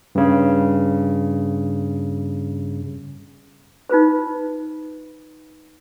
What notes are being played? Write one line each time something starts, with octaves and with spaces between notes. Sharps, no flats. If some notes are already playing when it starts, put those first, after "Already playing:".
G2 C#3
D#4 F4 B4 C5